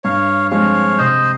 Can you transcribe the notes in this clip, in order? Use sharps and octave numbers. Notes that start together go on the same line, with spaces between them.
G2 C#5 F5
F3 G#3 C4 C#5 F5
C3 C5 D#5